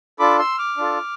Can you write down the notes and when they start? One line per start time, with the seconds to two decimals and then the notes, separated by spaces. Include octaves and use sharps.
0.19 D4 F4 A4 B5 D6
0.39 C6 E6
0.58 D6 F6
0.77 D4 F4 A4